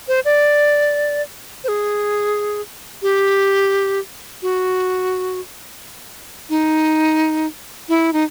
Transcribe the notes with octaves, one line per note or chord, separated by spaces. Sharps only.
C5
D5
C5
G#4
G4
F#4
D#4
E4
D#4